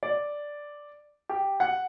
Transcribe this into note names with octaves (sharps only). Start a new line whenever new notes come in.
D5
G4
F#5